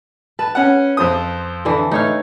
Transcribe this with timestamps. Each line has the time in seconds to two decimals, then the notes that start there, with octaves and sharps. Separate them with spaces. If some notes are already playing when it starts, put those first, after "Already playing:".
0.39 B4 A5
0.55 C#4 F#5
0.97 F2 C5 D#6
1.65 D3 E3
1.91 A3 D#4 C#5 F5